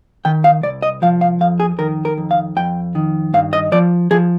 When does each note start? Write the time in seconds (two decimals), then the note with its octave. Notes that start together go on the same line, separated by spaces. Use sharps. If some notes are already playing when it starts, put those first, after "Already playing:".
0.25 D#3 G5
0.44 F5
0.63 C2 D5
0.82 D#5
1.02 F3 F5
1.21 F5
1.40 F2 F5
1.60 G#4
1.79 D#3 A#4
2.05 A#4
2.17 F2
2.31 F5
2.56 F2 G5
2.95 D#3
3.34 G2 F5
3.53 D#5
3.72 F3 D5
4.11 F3 G#4